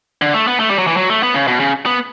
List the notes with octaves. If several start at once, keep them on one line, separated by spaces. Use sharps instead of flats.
D3
A3
B3
A3
G3
F#3
E3
F#3
A3
B3
C#3
B2
C#3
B3